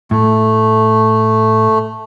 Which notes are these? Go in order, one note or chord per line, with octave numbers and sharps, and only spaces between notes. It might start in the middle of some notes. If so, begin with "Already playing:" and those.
A2 A3